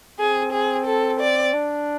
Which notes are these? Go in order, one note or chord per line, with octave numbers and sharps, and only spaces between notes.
C4 G#4
G#4
A4
D5
D4